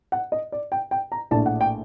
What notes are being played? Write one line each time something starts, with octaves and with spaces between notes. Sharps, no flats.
F#5
D#5
D5
G5
G5
A#5
A#1 A2 A3 D4 A5
F#5
G5